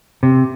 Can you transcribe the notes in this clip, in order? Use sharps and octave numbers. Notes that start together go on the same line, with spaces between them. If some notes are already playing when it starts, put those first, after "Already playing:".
C3